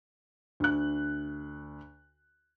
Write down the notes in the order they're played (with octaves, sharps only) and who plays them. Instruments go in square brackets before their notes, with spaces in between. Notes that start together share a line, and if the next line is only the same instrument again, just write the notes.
[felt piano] D2 F#6